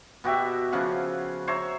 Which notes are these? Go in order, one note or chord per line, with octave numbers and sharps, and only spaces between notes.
B2 F#4 G4 E5
C#3 F3 C#4 F#5
C5 C#5 E5 A#5